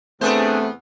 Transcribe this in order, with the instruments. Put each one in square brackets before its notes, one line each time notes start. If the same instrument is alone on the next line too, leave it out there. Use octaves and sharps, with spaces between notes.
[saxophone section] E2 C3 B3 [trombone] A3 [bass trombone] C4 [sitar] D4 G#4 C5